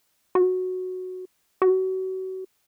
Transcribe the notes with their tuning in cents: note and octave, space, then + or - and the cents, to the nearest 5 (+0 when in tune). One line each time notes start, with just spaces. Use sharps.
F#4 -5
F#4 +30